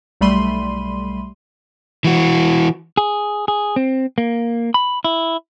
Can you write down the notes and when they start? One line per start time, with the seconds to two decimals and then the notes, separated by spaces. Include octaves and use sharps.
0.21 B1 G3 A3 B5 C6 D#7
2.04 E3 F#4
2.97 G#4
3.48 G#4
3.76 C4
4.18 A#3
4.74 B5
5.04 E4